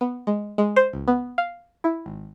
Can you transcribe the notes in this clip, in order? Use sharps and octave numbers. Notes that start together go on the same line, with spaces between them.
B3
G#3
G#3
C5
C#2
B3
F5
E4
G#1